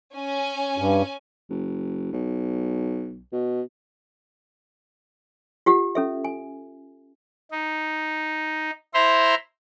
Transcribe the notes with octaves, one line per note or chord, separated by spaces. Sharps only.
C#4 G#5
G2
F#1
B1
B2
F4 G4 F#5
C#4 A4 E5
G#5
D#4
E4 C5 E5 A#5 C6